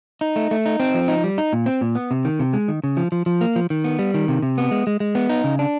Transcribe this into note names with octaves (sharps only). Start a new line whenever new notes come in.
D#4
A3
A3
D#4
C4
F3
D#4
G3
D#4
A#2
C4
A#2
B3
C3
D#3
C3
G#3
D#3
C#3
F3
F3
F3
A#3
F3
D#3
B3
G3
D#3
C3
C3
B3
G#3
G#3
G#3
B3
D#4
C#3
D4